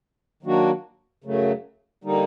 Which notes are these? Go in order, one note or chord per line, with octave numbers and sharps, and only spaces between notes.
D#3 F#3 A#3 D4 F#4
F#2 C#3 F#3 A3
D3 G3 A#3 D#4